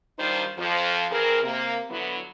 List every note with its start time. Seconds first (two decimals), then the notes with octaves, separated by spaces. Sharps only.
0.18 D#3 G3 D4 D#4 F4 C5
0.58 F2 F3
1.11 E3 C4 G#4 A#4
1.43 C3 A#3
1.90 D3 F#3 B3 E4